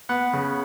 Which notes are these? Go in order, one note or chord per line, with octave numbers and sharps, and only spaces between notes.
B3 F#5
C#3